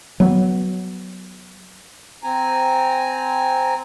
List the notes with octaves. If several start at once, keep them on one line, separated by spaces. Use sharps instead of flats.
F#3 B3
C4 G#5 A#5